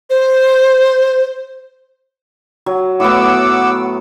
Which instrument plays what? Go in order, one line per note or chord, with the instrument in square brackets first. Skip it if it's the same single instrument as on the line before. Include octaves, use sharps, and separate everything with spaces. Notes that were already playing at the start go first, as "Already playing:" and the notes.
[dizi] C5
[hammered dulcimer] F#3
[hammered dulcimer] A2 B3 [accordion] F#5 D6 E6